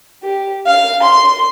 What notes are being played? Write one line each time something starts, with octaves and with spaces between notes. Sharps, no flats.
G4
F5
C6